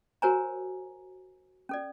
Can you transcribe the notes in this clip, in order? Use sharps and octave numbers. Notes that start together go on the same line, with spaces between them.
F#4 A#4 C5 C#5 G#5 A#5
C#4 A4 D5